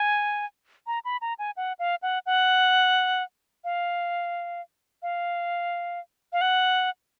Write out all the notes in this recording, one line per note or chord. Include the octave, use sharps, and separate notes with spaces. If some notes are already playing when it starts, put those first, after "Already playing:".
Already playing: G#5
A#5
B5
A#5
G#5
F#5
F5
F#5
F#5
F5
F5
F5
F#5